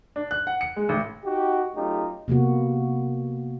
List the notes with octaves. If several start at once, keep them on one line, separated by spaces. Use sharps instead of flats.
D4
F#6
F#5
C#7
G#3
A1
D#4 F#4 G4
F#3 A3 C#4 D#4 F4 G4
C3 A#3 B3 F#4